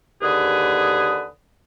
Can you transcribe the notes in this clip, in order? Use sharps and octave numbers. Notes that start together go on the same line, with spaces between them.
D#2 D3 G#4 B4 D#6